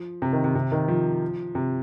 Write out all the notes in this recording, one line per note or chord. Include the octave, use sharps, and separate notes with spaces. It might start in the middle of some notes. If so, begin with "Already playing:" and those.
Already playing: F3
C3
D#3
C3
C3
D#3
F3
C3